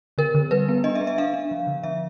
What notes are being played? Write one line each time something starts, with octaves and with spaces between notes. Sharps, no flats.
D3 A#4
D3
G3 B4
B3
D4 D#5
E5
B3
E5
D4 F5
D4
F3
D3
F3 E5